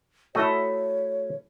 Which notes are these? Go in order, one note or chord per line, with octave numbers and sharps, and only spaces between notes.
A3 E4 F#4 A4 C#5 D#5